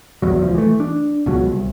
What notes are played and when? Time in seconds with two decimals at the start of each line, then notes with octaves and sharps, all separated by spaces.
0.22 A#1 E2 F#3
0.42 C#2 F3
0.54 E3 A3
0.80 D4
1.26 C#2 B2 F#3
1.46 C2